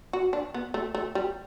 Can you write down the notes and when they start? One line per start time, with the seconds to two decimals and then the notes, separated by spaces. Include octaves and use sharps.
0.13 F#4
0.33 D4
0.54 B3
0.74 A3
0.95 A3
1.15 G3